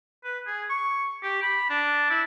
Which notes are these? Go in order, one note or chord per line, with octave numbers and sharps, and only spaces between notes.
B4
G#4
C#6
G4
B5
D4
E4